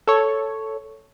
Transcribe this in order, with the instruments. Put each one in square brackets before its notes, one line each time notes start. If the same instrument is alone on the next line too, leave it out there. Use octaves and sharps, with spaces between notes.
[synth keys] A4 C#5